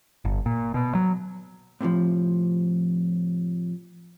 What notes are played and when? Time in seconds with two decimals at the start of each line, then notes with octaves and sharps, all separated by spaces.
0.25 G1
0.46 A#2
0.74 B2
0.95 F#3
1.81 A2 C3 D#3 F3